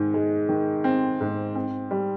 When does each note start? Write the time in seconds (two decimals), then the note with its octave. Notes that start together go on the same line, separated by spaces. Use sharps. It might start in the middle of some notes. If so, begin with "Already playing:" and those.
Already playing: G#2 D#3
0.14 G#3
0.49 D#3
0.84 C4
1.21 G#2
1.55 C4
1.91 G3